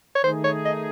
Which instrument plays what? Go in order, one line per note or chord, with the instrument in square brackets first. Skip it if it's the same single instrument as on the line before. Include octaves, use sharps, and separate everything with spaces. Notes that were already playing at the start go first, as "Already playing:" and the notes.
[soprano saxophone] C#5
[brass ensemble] D#3 A3 D#4 G#4 [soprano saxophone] C5
[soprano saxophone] C#5
D#5